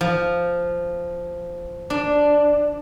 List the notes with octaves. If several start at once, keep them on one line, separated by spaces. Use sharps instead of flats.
F3
D4